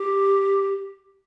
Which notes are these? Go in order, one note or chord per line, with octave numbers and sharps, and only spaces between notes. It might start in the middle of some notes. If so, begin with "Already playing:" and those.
Already playing: G4